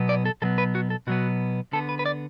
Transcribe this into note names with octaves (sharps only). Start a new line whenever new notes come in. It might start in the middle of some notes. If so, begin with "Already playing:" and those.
Already playing: B2 F#3 B3
D5
A4
B2 F#3 B3 A4
B4
F#4
A4
B2 F#3 B3 F#4
D3 B3 A4
B4
B4
D5